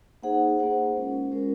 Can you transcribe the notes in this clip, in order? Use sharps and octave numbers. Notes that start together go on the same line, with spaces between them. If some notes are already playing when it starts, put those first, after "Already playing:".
A#3 D#4 G#4 C5 F#5
A#3 D#4 G#4 C5 F#5
G#3 C#4 F4 A#4
G#3 C#4 F4 A#4